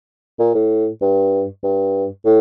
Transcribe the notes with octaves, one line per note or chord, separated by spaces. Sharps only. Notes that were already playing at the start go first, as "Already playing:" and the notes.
A#2
A2
G2
G2
A2